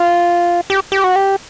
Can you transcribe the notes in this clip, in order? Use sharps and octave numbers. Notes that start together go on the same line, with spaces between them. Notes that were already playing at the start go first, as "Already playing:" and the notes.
Already playing: F4
G4
G4
F#4
G4